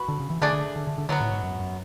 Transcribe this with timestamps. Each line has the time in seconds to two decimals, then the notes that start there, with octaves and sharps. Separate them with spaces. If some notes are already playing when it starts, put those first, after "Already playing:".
Already playing: F#4 B4
0.08 D3
0.20 C#3
0.30 E3
0.41 D3 A3 D4 G#4 D5
0.53 D3
0.76 D3
0.87 D3
0.98 D3
1.09 D3 F#3 B3 F#4
1.20 A2
1.32 G#2
1.42 F#2
1.59 F#2